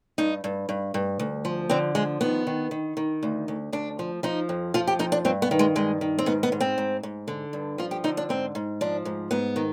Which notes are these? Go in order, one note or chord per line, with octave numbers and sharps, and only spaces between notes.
G2 D#4
G2
G2
G2
D2
F3
D3 C4
F3 G#3
D#3 B3
D#3
D#3
D#3
D2
D2
D2 D4
F3
F3 D#4
F2
F3 F4
G4
F2 D#4
D4
G2 C4
B3
D#3
G#3
G2 G#3
D#3
C4
G#2 B3
B3
G#2
C4
G#2
G#2
D3
G2
F3 F4
G4
D3 D#4
D4
G#2 C4
G#2
F3 D4
G#2
G#2 B3
D#3